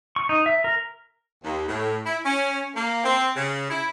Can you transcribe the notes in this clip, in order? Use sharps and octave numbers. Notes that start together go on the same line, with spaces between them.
C#6
D#4
E5
A#4
D#2
A2
E4
C#4
A#3
C4
C#3
E4